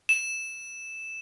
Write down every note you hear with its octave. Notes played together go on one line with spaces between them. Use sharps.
E7